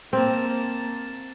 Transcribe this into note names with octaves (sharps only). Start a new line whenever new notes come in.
A#3 C4 A5